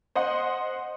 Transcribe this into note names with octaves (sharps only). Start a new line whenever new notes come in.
C5 D#5 F#5 C6